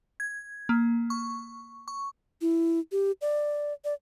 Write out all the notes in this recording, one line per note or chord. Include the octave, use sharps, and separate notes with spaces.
G#6
A#3
C#6
C#6
E4
G4
D5
D5